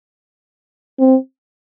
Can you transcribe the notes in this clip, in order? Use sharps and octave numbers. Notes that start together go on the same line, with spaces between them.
C4